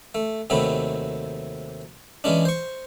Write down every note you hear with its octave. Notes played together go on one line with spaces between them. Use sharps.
A3
D#2 C3 F#3 A3 B5
E3 G#3 C#4 D4
C5 C#6